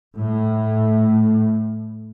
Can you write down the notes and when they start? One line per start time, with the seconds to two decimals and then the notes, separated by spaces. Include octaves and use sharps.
0.16 A2